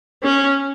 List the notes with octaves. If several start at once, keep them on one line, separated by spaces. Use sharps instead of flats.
C#4